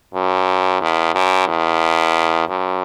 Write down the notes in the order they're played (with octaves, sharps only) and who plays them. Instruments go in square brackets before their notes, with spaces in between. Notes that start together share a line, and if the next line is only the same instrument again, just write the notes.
[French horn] F#2
E2
F#2
E2
F#2